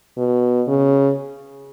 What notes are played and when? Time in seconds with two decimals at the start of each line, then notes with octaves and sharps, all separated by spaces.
0.17 B2
0.67 C#3